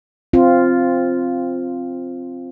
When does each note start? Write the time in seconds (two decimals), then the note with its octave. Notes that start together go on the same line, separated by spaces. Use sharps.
0.33 C4 F4